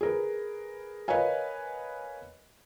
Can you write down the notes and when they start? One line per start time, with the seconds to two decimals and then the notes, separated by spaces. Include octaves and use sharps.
0.01 G#4 A#4 B4
1.08 A#4 B4 C#5 D#5 F5 G#5